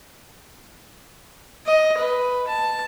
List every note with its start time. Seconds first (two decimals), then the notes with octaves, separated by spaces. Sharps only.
1.66 D#5
1.98 B4
2.47 A5